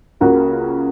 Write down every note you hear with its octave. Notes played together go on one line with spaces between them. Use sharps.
C#2 C#3 A#3 F#4 A#4